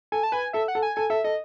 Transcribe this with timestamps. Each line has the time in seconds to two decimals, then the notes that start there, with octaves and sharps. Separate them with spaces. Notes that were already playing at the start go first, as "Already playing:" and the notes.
0.12 A4 G#5
0.23 A5
0.32 B4 G#5
0.53 A4 E5
0.68 F#5
0.75 A4
0.82 G#5
0.96 A4 G#5
1.10 A4 E5
1.24 A4 D#5